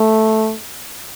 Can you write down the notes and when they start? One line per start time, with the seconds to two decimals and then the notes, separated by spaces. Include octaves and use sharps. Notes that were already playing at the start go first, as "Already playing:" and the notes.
Already playing: A3